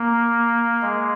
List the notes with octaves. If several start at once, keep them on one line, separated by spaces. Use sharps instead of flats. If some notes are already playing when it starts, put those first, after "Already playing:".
Already playing: A#3
G#3